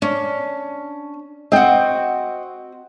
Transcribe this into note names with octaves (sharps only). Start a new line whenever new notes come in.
C#4 D4
C4 F#4 D#5 G5